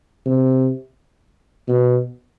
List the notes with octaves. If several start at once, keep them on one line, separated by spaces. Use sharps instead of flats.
C3
B2